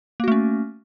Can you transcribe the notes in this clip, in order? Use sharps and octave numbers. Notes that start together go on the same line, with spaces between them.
A3 A#3 C#4 F#4